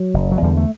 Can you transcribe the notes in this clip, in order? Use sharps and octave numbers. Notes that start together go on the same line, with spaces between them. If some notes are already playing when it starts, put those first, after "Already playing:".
Already playing: F#3
F#1
F#3
E2 D3 G3
A3